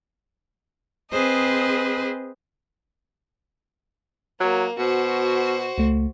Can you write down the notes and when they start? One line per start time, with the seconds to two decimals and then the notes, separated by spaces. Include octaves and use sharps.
1.10 C4 G#4 B4 C5 D#5
4.40 F#3 A#3
4.78 B2 F#4 C5
5.78 C#2 A3